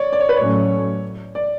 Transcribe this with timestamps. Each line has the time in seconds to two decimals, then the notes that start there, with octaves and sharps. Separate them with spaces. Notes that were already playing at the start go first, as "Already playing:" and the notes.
Already playing: C#5 D5
0.13 D5
0.20 C#5
0.29 B4
0.37 A2 F#3 A3 C#4 C#5
1.35 D5